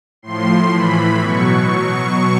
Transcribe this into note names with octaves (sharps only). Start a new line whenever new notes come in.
A2 F3 C6
A2 E3 B5
B2 F#3 C#6
B2 F#3